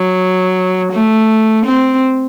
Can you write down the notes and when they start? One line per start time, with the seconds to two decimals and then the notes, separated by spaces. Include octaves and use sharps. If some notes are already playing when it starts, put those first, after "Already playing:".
Already playing: F#3
0.92 A3
1.66 C4